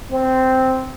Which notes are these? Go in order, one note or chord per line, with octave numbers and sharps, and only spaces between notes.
C4